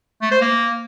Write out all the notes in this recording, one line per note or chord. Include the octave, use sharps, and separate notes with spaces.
A3
C5
A#3